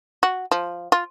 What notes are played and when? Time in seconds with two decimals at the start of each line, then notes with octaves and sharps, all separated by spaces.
0.23 F#4
0.51 F3
0.92 F4